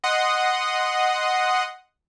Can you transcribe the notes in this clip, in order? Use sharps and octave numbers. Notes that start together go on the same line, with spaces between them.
D#5 F#5 C6 D#6